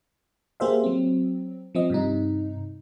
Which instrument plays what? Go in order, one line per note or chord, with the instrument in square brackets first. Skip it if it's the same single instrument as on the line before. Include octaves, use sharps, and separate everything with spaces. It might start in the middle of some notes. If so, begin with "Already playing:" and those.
[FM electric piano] A#3 G4 G#4 C5 E5 F5
F#3 C4
F3 C4 D#5
G2 C3 D#4